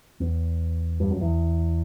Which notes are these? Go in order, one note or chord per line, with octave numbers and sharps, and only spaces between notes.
E2
G2
F#2
E2